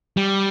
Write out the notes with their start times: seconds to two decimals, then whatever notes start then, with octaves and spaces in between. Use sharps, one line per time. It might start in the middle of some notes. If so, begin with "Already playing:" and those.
0.17 G3